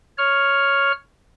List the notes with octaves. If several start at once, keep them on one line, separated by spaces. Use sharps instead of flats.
C#5 F6